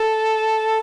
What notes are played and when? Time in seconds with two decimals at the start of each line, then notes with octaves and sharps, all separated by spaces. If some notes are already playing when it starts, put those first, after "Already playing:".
Already playing: A4